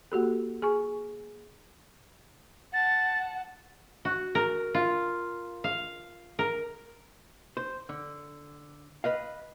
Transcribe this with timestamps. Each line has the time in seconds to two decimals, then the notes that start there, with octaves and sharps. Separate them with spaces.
0.12 A#3 F#4 G4 A4
0.62 G#4 G#5 C#6
2.74 F#5 A5 A6
4.05 F#4
4.35 A#4
4.74 F4
5.64 F5
6.39 A#4
7.57 C5
7.89 D3
9.04 B4 D#5 F5